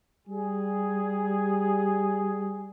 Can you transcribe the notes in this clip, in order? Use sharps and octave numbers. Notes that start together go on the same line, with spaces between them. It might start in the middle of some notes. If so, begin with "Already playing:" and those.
G3 G#4